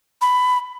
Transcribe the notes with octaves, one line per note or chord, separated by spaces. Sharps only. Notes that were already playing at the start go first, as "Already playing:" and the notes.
B5